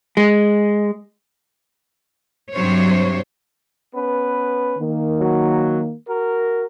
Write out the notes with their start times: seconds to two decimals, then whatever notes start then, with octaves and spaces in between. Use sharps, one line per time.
0.17 G#3
2.53 G2 C3 F#3 C5 C#5
3.93 B3 C#4 B4
4.78 D#3 A#3
5.18 F#3
6.07 F#4 A#4